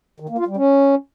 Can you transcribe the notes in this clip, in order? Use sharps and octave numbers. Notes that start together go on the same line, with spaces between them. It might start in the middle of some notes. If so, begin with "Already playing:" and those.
D#3
A#3
F4
G3
C#4